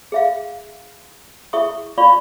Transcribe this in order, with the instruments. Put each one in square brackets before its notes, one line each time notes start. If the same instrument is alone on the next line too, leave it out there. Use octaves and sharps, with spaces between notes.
[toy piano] G#4 E5 F5
E4 G#4 E5 C#6 D#6
F4 D5 F5 B5 C#6